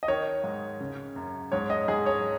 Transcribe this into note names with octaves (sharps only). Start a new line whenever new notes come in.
D#5
D#3 C#5
G#2
C#3
F#2
G#2 C#5
D#5
G#2 G#4
C#5